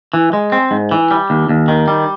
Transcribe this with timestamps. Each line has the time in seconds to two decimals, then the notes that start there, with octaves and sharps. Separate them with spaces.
0.14 E3
0.33 G#3
0.52 C4
0.71 G#2
0.91 E3
1.11 G3
1.30 D#2
1.49 D#2
1.68 D#3
1.88 G3